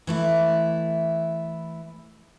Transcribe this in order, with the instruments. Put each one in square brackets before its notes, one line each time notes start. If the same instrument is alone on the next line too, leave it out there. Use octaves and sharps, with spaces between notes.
[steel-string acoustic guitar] E3 A3 E4